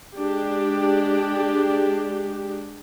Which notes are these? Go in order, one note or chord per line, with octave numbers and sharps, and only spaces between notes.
G#3 D4 G4